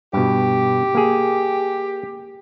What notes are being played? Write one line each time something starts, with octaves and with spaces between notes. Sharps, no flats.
G2 B2 G4
A#3 G#4